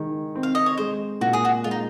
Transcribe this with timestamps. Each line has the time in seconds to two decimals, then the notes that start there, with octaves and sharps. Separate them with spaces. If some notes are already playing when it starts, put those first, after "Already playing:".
Already playing: D#3 G#3
0.35 C4
0.43 F5
0.55 D#5
0.66 C#5
0.78 G#3 C5
1.21 A#2 F#4
1.33 G#4
1.45 F#4
1.64 G#3 F4
1.71 D#4